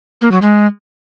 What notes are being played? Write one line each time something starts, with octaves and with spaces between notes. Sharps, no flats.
A#3
F#3
G#3